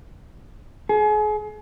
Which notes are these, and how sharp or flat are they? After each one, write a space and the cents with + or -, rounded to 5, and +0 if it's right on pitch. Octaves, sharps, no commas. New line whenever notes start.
G#4 +35